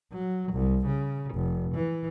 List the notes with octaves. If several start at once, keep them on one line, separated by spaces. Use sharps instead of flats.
F#3
C2
C#3
F1
E3